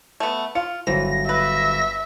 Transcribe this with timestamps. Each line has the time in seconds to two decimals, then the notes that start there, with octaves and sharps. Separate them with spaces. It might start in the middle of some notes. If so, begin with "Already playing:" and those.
0.20 A3 B3
0.55 F4 C#7
0.87 G1 E3 F#3 C5 A#6
1.29 B4 E5